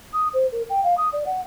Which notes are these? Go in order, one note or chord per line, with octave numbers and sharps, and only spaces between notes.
D#6
C5
A#4
G5
F5
D#6
D5
F#5